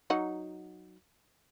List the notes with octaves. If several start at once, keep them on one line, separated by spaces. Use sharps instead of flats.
F#3 D#4 F#5